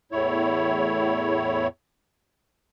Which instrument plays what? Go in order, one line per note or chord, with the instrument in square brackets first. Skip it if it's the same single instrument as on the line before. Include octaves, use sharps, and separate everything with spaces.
[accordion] E2 A2 E4 C#5